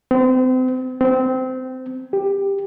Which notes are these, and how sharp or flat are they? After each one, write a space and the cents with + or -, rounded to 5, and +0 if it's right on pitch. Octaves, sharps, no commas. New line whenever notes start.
C4 -35
C4 -20
G4 +10